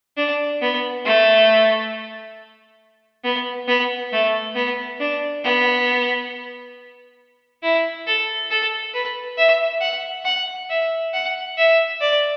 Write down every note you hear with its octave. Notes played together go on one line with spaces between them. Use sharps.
D4
B3
A3
B3
B3
A3
B3
D4
B3
E4
A4
A4
B4
E5
F#5
F#5
E5
F#5
E5
D5